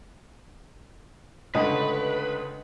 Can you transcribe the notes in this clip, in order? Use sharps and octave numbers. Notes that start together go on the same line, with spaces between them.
C#2 D3 A3 B4 D#5